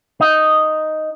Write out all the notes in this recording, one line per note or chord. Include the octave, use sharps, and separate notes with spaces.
D#4